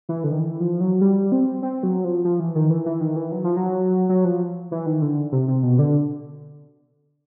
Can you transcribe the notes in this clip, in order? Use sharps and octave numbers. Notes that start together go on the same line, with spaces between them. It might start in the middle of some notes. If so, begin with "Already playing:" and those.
E3
D3
D#3
E3
F3
F#3
G3
C4
C4
F#3
F3
F3
E3
D#3
E3
E3
D#3
E3
F#3
F3
F#3
F#3
F3
E3
D#3
D3
C3
C3
B2
D3